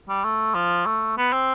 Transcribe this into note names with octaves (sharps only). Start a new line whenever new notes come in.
G3
A3
F3
A3
B3
C4